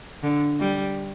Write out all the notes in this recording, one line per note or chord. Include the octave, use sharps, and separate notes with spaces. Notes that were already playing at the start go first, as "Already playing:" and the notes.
D3
G3